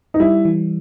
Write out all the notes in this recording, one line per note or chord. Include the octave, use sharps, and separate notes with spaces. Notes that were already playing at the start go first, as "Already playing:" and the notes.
D#4
G3 E4
E3